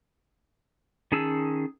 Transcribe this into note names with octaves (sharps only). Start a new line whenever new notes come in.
D#3 C#4 G#4 A5 E6